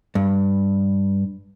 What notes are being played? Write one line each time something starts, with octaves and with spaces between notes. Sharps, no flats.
G2